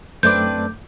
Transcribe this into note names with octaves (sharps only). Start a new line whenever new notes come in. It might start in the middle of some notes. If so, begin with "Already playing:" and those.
F#2 A3 C4 D4 B4 D6 G6